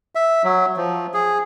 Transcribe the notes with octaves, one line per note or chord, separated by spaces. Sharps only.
E5
F#3
F3
G#4